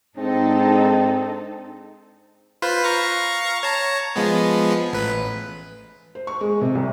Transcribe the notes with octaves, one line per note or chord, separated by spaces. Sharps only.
G#2 G#3 C4 D4 D#4 A4
F4 B4 C5
F5 A#5 C#6
C#5 A5 A#5
F3 G#3 B3
A1 B4
C5
C#6
G#3
C3
C2